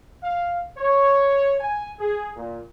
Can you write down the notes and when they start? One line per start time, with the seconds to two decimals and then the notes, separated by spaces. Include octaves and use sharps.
0.23 F5
0.77 C#5
1.60 G#5
1.99 G#4
2.36 A#2